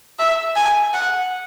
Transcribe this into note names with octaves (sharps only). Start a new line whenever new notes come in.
E5
G#5
F#5